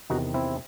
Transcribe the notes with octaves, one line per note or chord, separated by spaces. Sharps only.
E2 C3 D#3 D#4 F#4
C4 E4